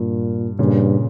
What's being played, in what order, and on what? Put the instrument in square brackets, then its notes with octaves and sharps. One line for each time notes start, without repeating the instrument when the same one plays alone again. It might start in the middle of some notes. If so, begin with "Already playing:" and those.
Already playing: [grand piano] G2 [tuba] A#2
[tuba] G2 [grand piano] A#2 C#3